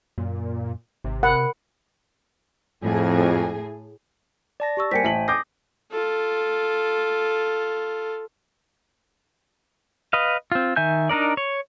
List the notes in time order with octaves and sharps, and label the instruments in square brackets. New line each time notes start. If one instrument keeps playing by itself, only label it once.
[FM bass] F#2 [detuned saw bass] A#2
[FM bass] G#1 [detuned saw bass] C3
[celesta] A#4 B5 [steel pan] F#5
[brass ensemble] F2 [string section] A2 G#4
[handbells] D5 A5 A#6
[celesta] G4 C#6 E6
[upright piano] G3 A#3 [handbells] C5 G5 G#5 [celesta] B6 C#7
[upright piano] A1 B6 F#7 [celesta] E5 A5
[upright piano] D6 G6 C7 [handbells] D#6 [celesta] A#6
[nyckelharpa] F4 A4
[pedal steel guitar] B4 D#5 F5
C4 F4
D#3 E5 G#5 G6
D4 D#4 A#4 D5
C#5